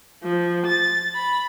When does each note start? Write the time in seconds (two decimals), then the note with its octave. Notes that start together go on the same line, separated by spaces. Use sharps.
0.23 F3
0.66 A6
1.15 B5